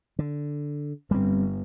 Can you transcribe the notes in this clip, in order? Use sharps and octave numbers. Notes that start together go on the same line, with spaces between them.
D3
G1 G3 C4